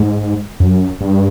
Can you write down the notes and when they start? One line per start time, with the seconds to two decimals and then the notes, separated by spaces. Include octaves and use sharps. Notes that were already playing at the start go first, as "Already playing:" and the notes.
Already playing: G#2
0.60 F#2
1.01 G2